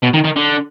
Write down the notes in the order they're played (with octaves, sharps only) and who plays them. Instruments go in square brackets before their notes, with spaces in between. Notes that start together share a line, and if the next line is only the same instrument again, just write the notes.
[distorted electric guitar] B2
D#3
D#3
D3